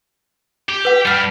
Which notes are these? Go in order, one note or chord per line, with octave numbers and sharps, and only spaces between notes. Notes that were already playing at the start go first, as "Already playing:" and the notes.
G4
B4 F#5
G3 D4 F#5 F6 C7